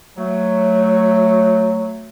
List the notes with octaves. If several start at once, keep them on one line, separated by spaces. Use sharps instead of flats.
F#3 A3